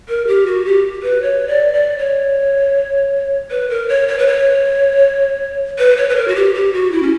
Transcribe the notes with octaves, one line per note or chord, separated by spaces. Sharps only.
A#4
G4
F#4
G4
B4
C#5
D5
D5
C#5
B4
A#4
C#5
C#5
B4
C#5
B4
C#5
B4
A#4
F#4
G4
G4
F#4
E4
C#4